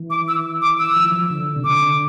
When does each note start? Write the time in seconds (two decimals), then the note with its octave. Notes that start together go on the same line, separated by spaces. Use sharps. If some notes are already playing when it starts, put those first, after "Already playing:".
Already playing: E3
0.10 D6
0.28 E6
0.62 D6
0.79 E6
0.96 F3
1.04 E3
1.11 F3
1.30 D3
1.56 C3
1.64 D3 D6